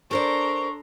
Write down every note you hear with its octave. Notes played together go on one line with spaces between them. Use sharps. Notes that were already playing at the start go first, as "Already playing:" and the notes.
D4 A4 A#4 C5 D5 A#5 C6 C#6